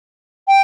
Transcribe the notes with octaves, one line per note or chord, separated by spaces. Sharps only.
G5